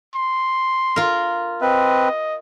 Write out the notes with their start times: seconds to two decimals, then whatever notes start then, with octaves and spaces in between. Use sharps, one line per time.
0.15 C6
0.96 F4 A#4
1.62 C4 B4 D#5